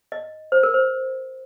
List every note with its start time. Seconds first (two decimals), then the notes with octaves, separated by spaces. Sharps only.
0.12 D#5
0.52 C5
0.63 A#4
0.74 C5